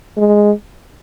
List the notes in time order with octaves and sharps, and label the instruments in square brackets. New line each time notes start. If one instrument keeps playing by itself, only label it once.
[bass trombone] G#3